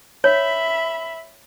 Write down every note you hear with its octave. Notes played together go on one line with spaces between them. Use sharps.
C#5 E5 B5